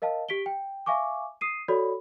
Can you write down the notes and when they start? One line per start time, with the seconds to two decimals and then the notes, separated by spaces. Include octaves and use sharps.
0.02 A#4 D#5 F5 A5
0.29 G4 B6 D7 G7
0.46 G5
0.86 E5 F5 G#5 C#6 D6
1.41 D#6 C7 D#7
1.68 F#4 A4 C#5 D5 B5